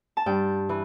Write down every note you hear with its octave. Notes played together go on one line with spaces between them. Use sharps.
A5
G2 G5
E3